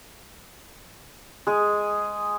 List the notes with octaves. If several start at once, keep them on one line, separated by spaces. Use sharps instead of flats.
G#3 G#4